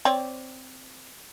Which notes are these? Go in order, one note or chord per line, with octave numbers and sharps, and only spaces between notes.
C4 C#5 D5